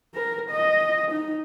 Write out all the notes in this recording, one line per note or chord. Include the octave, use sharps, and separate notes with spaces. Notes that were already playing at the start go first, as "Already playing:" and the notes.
A#4
D#5
D#4